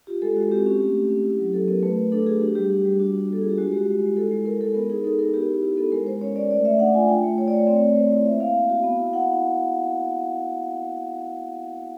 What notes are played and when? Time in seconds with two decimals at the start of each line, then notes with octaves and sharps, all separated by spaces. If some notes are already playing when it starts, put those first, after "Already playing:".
0.07 F4 G4
0.22 G#3 A4
0.37 G#3 F#4
0.51 C4 G4
0.66 C#4 G4
0.80 A3 G4
0.95 C#4 G4
1.10 C#4
1.25 E4
1.39 F#3
1.53 F#3 A4
1.68 B3 A#4
1.83 A3 B4
1.98 A3
2.12 D4 A4
2.26 F#4 G#4
2.41 D4 G4
2.55 G3 G4
2.70 D4 G4
2.85 G3
3.00 D4 F#4
3.14 D4
3.29 A#3 A4
3.41 F4 G#4
3.50 G4
3.58 G#3 F#4
3.73 G#3 G4
3.87 G#3
4.02 G#3
4.17 E4 A4
4.31 G#3
4.45 G#3 A#4
4.61 G#3 A4
4.74 B3 A#4
4.90 D#4 G#4
5.04 D#4 A4
5.19 D#4 A#4
5.33 B3 G4
5.48 E4
5.63 E4 G4
5.77 B3 A4
5.92 G#3 A#4
6.07 G#3 C5
6.21 C#4 C#5
6.36 C#4 D5
6.51 A3 D5
6.65 A3 E5
6.79 D4 F#5
6.94 F4 G#5
7.09 F4 G5
7.23 A3
7.38 A3 C#5
7.48 D5
7.53 A3 C#5
7.67 C4 D5
7.77 C#5
7.82 C4
7.96 C4 C5
8.11 E4
8.26 A#3 E5
8.40 A#3 F5
8.55 A#3
8.70 F#4
8.84 B3
8.99 E4
9.13 E4 F#5